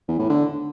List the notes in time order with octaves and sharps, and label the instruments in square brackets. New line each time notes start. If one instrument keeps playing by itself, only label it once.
[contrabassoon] E2
A2
D3